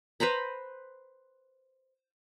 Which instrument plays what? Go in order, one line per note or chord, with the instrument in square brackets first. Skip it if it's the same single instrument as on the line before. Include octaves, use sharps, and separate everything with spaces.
[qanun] B4 C5 A#5 B5